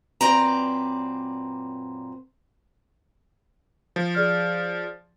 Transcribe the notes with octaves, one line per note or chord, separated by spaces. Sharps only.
F#2 A#2 C4 B4 D5 A#5
F3
G#4 D5 F6